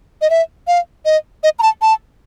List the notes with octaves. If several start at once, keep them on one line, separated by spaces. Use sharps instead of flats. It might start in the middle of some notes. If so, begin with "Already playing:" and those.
D#5
E5
F5
D#5
D#5
A#5
A5
A5